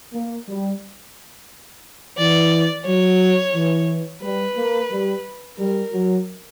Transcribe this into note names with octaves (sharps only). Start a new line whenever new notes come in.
A#3
G3
E3 D5
F#3 C#5
E3
G3 B4
A#3
G3
G3 A#4
F#3